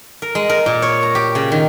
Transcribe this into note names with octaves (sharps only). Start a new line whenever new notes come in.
A#4
G#3
A#4
A#2
C#5
A#5
G4
C#3
D#3